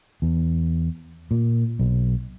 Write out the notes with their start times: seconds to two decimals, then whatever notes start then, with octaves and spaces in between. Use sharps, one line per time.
0.22 E2
1.31 A#2
1.79 B1